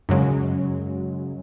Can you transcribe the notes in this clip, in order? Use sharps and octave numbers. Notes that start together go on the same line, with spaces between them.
F#2 C#3 F#3 G#3